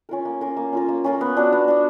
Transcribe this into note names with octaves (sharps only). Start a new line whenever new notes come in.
C#4 F4 A#4
A#3
C#4 F4 A#4
A#3
C#4 F4 A#4
A#3
C#4 F4 A#4
B3
D4 F#4
B3
D4 F#4